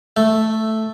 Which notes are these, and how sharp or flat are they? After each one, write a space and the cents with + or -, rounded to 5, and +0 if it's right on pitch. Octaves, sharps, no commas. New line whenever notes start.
A3 +0 E5 +0